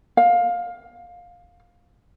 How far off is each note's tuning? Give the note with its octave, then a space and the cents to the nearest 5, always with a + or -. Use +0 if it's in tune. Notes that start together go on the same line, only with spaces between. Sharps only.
F5 +15